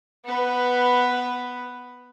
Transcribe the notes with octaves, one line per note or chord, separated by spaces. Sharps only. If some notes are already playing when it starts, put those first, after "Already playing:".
B3 B4